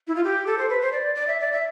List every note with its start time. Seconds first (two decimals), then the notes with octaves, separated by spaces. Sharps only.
0.07 E4
0.15 F4
0.24 G4
0.47 A4
0.58 C5
0.69 B4
0.81 C5
0.92 D5
1.15 D5
1.27 E5
1.40 D5
1.52 E5